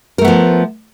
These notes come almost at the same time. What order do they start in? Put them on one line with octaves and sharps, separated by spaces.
A#4 A3 B3 F3